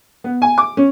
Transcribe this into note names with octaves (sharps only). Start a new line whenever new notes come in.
B3
G#5
D6
C#4